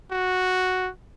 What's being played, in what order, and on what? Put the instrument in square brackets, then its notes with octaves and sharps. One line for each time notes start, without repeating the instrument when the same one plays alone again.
[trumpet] F#4